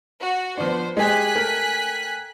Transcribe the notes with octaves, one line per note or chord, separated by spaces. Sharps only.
F#4
F3 B3 D4 C5
G#3 G4 G#4 G#5 F#6 B6
A3 A#4 G5